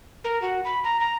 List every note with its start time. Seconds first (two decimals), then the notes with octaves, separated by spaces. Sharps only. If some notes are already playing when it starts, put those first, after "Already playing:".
0.24 A#4
0.42 F#4
0.65 B5
0.84 A#5
1.00 A#5